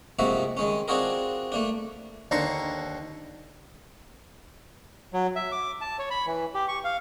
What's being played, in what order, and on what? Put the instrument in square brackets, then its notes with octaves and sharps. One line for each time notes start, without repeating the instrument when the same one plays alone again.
[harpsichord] G#2 C3 F3 A#3 F#4 E5
D#3 G#3 C#4
C4 D4 F4 F#4 G#4 A#4
A3 A#3 D4
D#2 D3 C5 A#5 C#6
[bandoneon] F#3
E5
D6
A5
C#5
B5
E3
G4
C#6
F5